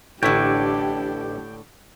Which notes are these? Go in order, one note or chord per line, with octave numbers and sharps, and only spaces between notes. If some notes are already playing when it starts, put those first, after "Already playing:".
A1 A2 D3 D4 E4 G4 G5